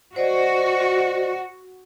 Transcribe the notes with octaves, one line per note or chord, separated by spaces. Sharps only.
F#4 C5 D5 D#5